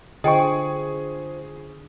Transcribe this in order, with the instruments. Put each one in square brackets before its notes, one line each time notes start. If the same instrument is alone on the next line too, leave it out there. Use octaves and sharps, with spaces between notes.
[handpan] D3 [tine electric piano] F4 C5 [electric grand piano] G#4 C#6 [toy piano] D#5 G5 G#5